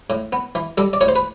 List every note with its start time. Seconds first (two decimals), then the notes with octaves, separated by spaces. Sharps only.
0.10 A2
0.33 B3
0.55 E3
0.77 G3 A4
0.93 D5
1.01 A2 C#5
1.08 C5
1.16 B4